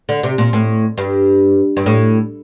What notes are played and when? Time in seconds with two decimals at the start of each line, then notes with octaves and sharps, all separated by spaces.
0.09 D3
0.23 C3
0.38 A#2
0.53 A2
0.98 G2
1.77 G2
1.86 A2